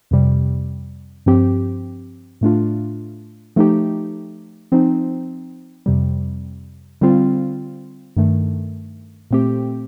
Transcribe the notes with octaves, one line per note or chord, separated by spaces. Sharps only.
F2 C3 G3
G2 F3 C4 G4
A2 A3 D4 F4
F3 A3 D#4 G4
F3 C4 D#4
F2 C3 G3
D3 G3 C4 F4
G2 D#3 A3
A#2 A3 C4 G4